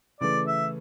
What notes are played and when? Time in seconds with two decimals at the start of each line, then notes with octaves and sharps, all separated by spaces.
0.21 C#3 E3 A3 D5
0.47 E5